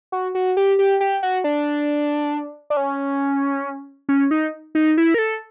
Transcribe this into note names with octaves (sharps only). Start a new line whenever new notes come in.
F#4
F#4
G4
G4
G4
F#4
D4
D4
C#4
C#4
D#4
D#4
E4
A#4
A4